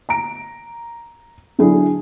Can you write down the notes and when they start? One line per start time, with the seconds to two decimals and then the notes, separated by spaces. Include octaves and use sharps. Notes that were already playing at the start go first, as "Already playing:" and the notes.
0.09 A#5 D7
1.59 D3 F#3 D4 E4 G#4